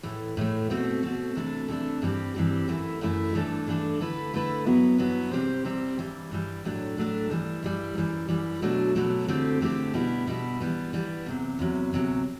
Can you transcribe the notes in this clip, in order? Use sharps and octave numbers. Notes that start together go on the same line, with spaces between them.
A2 E3 A3
A2 E3 A3
B2 A3 C4 F#4
B2 A3 C4 F#4
C3 E3 A3 D4 A4
C3 E3 A3 D4 A4
G2 E3 G3 C4 G4
G2 E3 G3 C4 G4
F#2 E3 A3 E4
F#2 E3 A3 E4
G2 E3 A3 D4 A4
G2 E3 A3 D4 A4
D3 A3 E4 B4
D3 A3 E4 B4
G2 F#3 B3 E4
G2 F#3 B3 E4
C3 G3 C4 G4 C5
C3 G3 C4 G4 C5
G2 E3 G3
G2 E3 G3
A2 F#3 A3 D4
A2 F#3 A3 D4
G2 E3 G3
G2 E3 G3
F#2 E3 G3
F#2 E3 G3
B2 F#3 A3 D4
B2 F#3 A3 D4
D3 A3 C4 E4 G4
D3 A3 C4 E4 G4
B2 G3 B3 E4
B2 G3 B3 E4
E3 G3 B3
E3 G3 B3
E2 C3 F#3
E2 C3 F#3
D2 C3 F#3